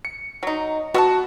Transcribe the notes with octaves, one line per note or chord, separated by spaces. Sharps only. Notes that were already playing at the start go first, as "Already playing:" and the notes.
C#7
F#3 D#4
B3 F#4 E5 A5